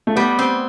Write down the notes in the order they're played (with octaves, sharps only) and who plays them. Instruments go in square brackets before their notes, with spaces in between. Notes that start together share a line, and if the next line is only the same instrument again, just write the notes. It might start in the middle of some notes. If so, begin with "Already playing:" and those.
[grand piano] A3
[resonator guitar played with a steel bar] G3 [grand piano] B3
[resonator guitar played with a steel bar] C4